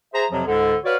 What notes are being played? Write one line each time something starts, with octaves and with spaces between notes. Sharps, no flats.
G#4 C5 E5 A#5
F2 C3 F3 F#3
C#2 G#2 D3
F#4 B4 C#5 D5 F5